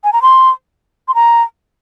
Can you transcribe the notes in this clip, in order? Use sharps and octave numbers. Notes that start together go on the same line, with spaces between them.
G#5
A#5
C6
C6
A#5